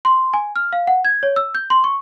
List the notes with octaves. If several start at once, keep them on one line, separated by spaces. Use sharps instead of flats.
C6
G#5
F6
F5
F#5
G#6
C#5
E6
G6
C6
C#6